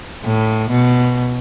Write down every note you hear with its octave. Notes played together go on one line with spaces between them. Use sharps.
A2
B2